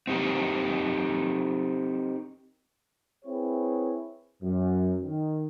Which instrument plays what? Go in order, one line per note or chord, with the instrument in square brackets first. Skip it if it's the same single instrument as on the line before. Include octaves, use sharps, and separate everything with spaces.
[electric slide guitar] C4 D#4 G4 A#4
[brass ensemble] C4 E4 G#4 B4 C#5
F#2
D#3